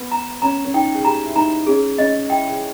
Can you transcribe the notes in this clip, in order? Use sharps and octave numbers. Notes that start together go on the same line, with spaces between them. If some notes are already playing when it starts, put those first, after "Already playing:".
Already playing: B3 B4
A#5
C#4 A#5
C#4
D#4 G5
G#4
G4 A#5
E4
D#4 A#5
C#4 G#4
C#4 D#5
E4 G5
G#4